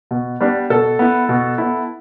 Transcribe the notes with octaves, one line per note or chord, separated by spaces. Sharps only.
B2
G3 B3 D4
B2 A4
B3 E4
B2
B3 E4